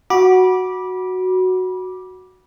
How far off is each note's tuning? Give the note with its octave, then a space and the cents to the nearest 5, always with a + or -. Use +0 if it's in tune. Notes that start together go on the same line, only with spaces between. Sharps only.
F#4 +0 B5 -25 D6 +0